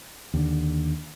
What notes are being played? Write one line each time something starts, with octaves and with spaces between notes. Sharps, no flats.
D#2 D3